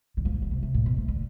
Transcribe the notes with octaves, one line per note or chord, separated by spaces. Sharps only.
D3
F3
E3
D3
C3
C3
A2
B2
C3
D3